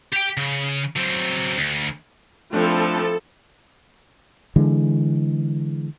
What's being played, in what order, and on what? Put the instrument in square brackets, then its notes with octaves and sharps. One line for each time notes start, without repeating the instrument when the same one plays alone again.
[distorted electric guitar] G4 G5
C#3
F#3 C4
D2
[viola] F3 [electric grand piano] A3 D4 [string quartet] C4 E4 [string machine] A4
[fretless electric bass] D3 E3 G#3